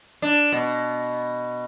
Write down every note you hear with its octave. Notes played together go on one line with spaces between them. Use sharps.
D4
B2